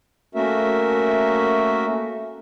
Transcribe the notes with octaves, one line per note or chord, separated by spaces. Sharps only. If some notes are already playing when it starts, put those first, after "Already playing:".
A3 A#3 C#4 F#4 A#4 E5